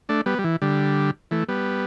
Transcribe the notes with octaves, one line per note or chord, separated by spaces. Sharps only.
A3 D4
G3 B3
G3
E3
D3 G3
E3 A3
G3 B3